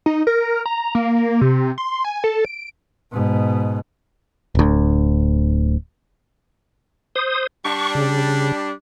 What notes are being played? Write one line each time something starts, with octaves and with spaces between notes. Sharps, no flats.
D#4
A#4
A#5
A#3
C3
C6
G#5
A4
D7
G#2 B2
D1 D2
C5 D#6
G3 D4 C#6
C#3